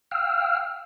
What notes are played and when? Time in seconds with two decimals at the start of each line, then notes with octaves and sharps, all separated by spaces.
0.11 F5 G5 E6 F6